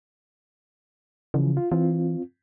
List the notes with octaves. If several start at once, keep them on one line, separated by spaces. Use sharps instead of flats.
C#3 E3 F3
F4
E3 C4 F4